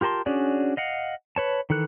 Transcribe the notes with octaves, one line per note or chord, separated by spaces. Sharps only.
F4 G4 A#4 A5 C6
C#4 D4 F#4 G#4 D5
D#5 F5 F#5
B4 C#5 A5
D#3 E3 A4 F#6